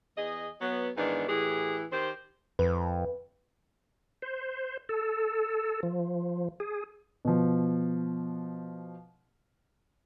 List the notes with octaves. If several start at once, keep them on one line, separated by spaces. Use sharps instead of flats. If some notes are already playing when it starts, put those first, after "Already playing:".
E2 G#4 D#5
F#3 B3
G#2 D#3 E3 B3 D4
A2 E3 G4 G#4
D#3 G4 C5
F2 B4
C5
A4
F3
G#4
B2 F3